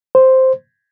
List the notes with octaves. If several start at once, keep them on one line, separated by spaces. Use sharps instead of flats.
C5